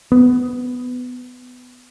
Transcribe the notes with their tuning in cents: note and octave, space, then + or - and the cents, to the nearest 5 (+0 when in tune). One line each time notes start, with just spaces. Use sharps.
B3 +15